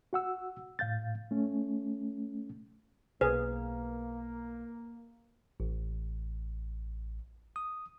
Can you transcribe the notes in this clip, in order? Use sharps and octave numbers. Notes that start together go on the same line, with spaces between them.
F#4 F#5 E6
A2 F5 G6 A6
A3 C#4
B1 A#3 G#4 B4
A1
D#6